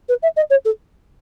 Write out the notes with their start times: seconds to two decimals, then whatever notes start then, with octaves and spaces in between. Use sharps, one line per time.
0.09 B4
0.22 E5
0.36 D#5
0.50 C#5
0.65 A4